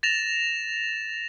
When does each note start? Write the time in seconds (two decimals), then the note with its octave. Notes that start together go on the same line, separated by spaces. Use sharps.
0.03 A6 A#6 E7 F7